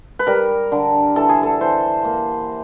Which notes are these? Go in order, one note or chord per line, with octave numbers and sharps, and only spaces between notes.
B4
G3 A#4
D3
E3 A4
G#4
A4
E3 C5
A#3